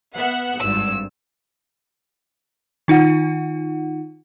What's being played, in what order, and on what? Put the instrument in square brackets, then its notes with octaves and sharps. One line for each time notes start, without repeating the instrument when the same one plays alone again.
[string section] B3 E5 F#5
[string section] G#1 G2 [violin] E6
[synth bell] D#3 D#4 F4 F#5